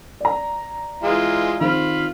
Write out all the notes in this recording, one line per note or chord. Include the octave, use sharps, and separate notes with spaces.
D5 A#5
E3 G#3 F4
D#3 C4 F4 B5 F6